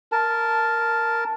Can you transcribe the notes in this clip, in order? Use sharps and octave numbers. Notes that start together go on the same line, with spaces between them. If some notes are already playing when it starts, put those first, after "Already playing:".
A#4 A5